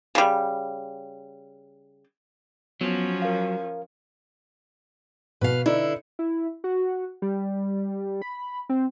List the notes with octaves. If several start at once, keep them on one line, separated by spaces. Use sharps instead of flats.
C#3 G3
F3 F#3 B3 C#4
A#4 F5
B2 B4 F5
D3 D#4 E4
E4
F#4
G3
B5
C4